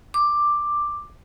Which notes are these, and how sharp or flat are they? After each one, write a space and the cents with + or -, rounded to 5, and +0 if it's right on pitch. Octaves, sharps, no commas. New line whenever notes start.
D6 +5